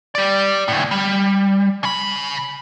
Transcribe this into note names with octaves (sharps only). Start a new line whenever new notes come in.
G4 D5
D2 A2
G3
C#3 B5